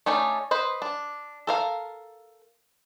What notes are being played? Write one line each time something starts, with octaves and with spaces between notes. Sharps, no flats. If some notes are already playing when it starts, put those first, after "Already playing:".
A3 C#4 D#4 D5
B4 C5 D#5
D4
A4 A#4 F5